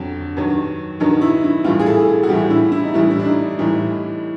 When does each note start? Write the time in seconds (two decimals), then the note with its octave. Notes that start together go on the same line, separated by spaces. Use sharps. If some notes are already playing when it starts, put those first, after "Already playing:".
Already playing: F2 D3 F#3
0.37 G2 D#3 F#3
1.00 G2 D#3 F#3 D#4
1.21 E4
1.44 E4
1.65 A2 E3 G3 F4
1.79 G#4
1.86 A4
2.00 A4
2.08 G#4
2.23 F#4
2.29 A2 E3 G3 G4
2.50 E4
2.72 E4
2.83 D#4
2.94 A2 E3 G3 E4
3.11 E4
3.19 D4
3.26 D#4
3.59 A2 E3 G3 D#4